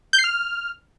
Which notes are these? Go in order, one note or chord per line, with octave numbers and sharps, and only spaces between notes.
G6
C7
F6